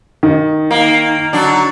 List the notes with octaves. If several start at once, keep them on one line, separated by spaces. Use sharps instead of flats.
D#3
A#3 D#4
D3 F#3 D4